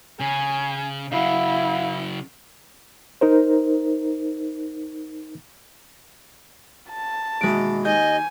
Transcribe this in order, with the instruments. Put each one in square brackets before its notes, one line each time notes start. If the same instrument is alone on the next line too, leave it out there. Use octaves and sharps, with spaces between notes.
[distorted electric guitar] C#3 [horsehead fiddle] G#5
[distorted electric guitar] C#3 F#3 [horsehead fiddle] E4 [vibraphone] F5 F#5
[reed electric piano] D#4 A#4 C5
[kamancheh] A5
[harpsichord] D#2 B2 E3 [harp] G#3 D7
[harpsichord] D#2 [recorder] D#5 [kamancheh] G#5 [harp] G6